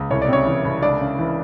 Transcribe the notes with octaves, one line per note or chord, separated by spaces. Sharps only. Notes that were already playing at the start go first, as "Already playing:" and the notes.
Already playing: C#2
C2 C#5
D5
C3 C#4 C#5
E3
C2
C#2 D4 D5
C#3
E3